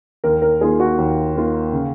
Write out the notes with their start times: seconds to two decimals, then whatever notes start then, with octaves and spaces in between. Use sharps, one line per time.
0.24 D#2 A#4
0.42 A#4
0.61 D#3 A#3 F4 G#4
0.80 F#4
0.98 D#2
1.35 D#3 A#3 F4
1.73 C#3